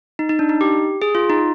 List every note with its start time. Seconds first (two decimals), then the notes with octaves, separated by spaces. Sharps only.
0.19 D#4
0.29 D#4
0.39 D4
0.49 D#4
0.61 G4
1.02 G#4
1.15 F4
1.30 D#4